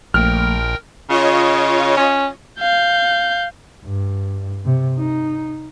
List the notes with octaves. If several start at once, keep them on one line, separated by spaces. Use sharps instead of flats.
A#1 F3 A3 A#3 A#4 G5 F6
C#3 F4 C#5 D#5
C#4
F5 G6
G2
C3
D#4